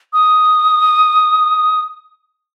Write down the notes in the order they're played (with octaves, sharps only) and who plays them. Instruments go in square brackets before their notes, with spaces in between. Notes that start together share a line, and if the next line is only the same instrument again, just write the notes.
[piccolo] D#6